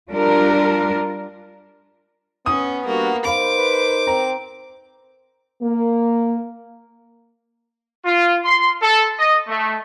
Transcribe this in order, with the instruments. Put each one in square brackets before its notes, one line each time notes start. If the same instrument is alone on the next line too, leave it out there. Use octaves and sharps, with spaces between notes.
[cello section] G3 D4 F4 A#4
[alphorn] B3 [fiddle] C#4 [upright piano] D#6
[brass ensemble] G3 D4 F#4 [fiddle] A#3
[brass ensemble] D#4 A#4 C5 [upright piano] F5 B5 [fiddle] D6
[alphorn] B4
[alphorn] C4 [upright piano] A#5
[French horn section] A#3
[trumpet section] F4
C6
A4
D#5
A3